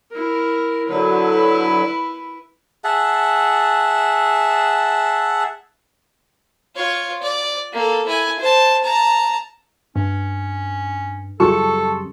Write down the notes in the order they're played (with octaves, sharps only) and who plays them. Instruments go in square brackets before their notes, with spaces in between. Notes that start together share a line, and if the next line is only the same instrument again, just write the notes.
[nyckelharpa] E4 A#4
[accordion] D3 F#3 [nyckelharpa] E4 B4
[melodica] G#4 E5 F#5 A5
[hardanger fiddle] F4 C#5
D5
A#3 A4
E4 G#5
C5 A5
A5 A#5
[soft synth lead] G2 [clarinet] C#4
[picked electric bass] F#2 C#3 G3 [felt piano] F4 G#4 C#6 [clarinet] A4 [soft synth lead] A5